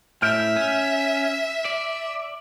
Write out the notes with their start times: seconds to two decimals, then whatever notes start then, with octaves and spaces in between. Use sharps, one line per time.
0.22 A2 E5 F6 G6 D7
0.56 C#4
1.65 D5